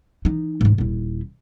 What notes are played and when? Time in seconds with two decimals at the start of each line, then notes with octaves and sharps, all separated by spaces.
0.25 E3 D#4
0.61 G#2 E3
0.78 D#1 E4